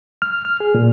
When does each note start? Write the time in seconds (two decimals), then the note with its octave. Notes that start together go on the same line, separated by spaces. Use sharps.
0.22 F6
0.45 F6
0.60 G#4
0.75 A#2